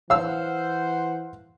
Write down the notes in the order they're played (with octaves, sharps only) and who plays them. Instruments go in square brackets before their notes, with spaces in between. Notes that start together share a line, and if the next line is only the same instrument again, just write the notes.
[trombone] E3 [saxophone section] C5 F#5 [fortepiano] F5 E6